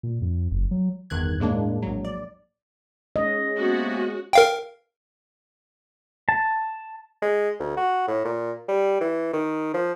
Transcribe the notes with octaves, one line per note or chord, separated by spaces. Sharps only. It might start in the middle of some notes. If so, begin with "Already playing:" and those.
A#2
F2
F#1
F#3
G1 E2 G2 D#3 F#6 G#6
A2 G#3 A#3 D4
A#1 F#3
D5
G#3 C#4 D#5
C3 A#3 B3 F#4
A#4 F5 G5
A5
G#3
D2
F#4
A2
A#2
G3
E3
D#3
F3